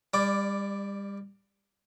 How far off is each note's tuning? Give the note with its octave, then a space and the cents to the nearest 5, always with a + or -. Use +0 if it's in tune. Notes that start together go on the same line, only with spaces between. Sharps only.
G3 +30 D5 +0 D6 +5